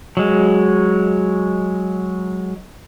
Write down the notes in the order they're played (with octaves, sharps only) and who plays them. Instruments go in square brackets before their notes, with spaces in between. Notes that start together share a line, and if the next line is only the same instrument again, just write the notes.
[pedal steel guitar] F#3 G#3